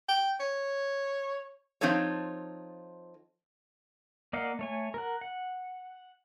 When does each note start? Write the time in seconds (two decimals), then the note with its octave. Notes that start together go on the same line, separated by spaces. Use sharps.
0.09 G5
0.40 C#5
1.81 F3 C4 D#4 F4 A4 C#5
4.33 A#3 D5 D#5 F5 F#5
4.59 A3 C#5 G#5
4.94 A#4 F#5
5.21 F#5